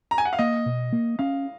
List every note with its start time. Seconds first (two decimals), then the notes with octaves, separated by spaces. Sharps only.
0.11 A#5
0.18 G#5
0.25 F#5
0.33 F5
0.39 A#3 D#5
0.66 B2
0.93 A#3
1.19 C#4 F5